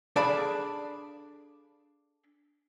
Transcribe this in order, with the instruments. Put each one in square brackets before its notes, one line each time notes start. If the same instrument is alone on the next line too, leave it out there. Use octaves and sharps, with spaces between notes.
[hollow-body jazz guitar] D4 G#4 A4 D5 F5 B5